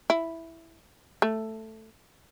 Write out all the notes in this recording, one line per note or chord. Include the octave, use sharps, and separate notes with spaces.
E4
A3